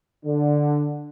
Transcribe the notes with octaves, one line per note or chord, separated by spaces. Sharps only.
D3